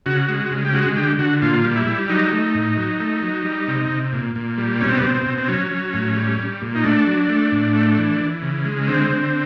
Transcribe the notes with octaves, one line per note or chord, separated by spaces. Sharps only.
C#3 F#4
G#3
C#3
G4
G#3 F#4
D3 G4
D3 F#4
A#2 F4
G3
E4
G3
F#3 D#4
A3
A2
F#3
A3
F#3
G3
C3
C3
A#2
A#2
G3
B2 C#4
C4
B3
B2 C4
C4
B2
C4
F#3 C#4
F#3
A2
G3
G3
A#2
D#4
A3 D4
F#3
A3
A2
A3
E3
E3
C#3
G#3
D3 C4
D3